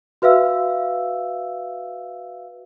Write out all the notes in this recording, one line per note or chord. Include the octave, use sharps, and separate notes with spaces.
F#4 B4 E5 F5 E6